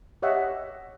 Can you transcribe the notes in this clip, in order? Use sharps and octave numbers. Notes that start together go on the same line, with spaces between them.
G4 C#5 D#5 E5 F#5